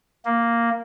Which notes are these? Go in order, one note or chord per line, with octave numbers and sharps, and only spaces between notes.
A#3